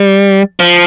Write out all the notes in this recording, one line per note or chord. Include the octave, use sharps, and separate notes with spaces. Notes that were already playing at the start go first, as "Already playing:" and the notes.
Already playing: G3
F3